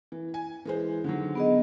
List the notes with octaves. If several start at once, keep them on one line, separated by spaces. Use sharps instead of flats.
E3
G#5
E3 G#3 C5
D3 D#3 F#3
B3 G#4 D#5